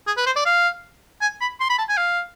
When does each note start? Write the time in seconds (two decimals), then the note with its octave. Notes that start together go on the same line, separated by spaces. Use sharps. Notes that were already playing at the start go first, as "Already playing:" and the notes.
0.07 G#4
0.17 B4
0.26 C5
0.36 D5
0.46 F5
1.21 G#5
1.41 B5
1.60 C6
1.70 B5
1.78 A5
1.89 G#5
1.97 F5